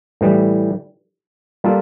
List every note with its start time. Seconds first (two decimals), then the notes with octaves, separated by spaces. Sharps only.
0.21 A2 E3 G3
1.64 G3 A#3 F4 A4